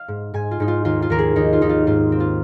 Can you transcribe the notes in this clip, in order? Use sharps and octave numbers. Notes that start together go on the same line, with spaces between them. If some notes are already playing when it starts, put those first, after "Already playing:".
Already playing: F5
G#2
G#2 G#5
F4
G#2 D#4
F4
D#2 F4
F4
D#2 A#4
G#4
D#2 D#4
F4
D#2 D#4
F4
G#2 F4
C4
F4